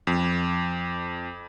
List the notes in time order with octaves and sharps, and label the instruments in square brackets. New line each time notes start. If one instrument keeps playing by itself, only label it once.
[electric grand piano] F2